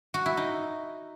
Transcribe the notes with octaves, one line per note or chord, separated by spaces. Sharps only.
F#4
E4
D#4